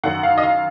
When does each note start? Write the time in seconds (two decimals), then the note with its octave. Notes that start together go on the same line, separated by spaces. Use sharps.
0.04 F#2 D#3 F#5
0.23 F5
0.38 D#5
0.42 F5